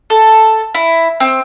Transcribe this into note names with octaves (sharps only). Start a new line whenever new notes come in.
A4
E4
C4